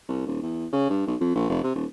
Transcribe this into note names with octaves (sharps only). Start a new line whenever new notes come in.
C2
D#1
E2
C#3
G2
B1
F2
A#1
F1
C3
D#1